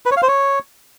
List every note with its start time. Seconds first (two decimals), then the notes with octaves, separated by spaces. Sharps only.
0.06 B4
0.11 C#5
0.17 F5
0.22 C5
0.28 C#5